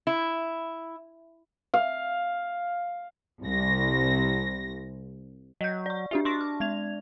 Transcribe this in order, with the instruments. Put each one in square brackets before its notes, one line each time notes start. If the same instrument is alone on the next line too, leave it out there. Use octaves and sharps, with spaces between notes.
[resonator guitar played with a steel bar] E4
[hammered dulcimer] F5
[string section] C2 A#6
[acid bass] F#3 [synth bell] D#5 G6
[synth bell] D5 C#6
[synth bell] D4 G4 E5 [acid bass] F4
[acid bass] D4 [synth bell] C6 C#6 A#6
[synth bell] F6
G#3 G#6 F7